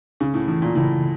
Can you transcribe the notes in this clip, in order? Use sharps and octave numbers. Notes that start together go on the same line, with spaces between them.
C#2 C#3
A2
A2 E3
A#2
A2 C#3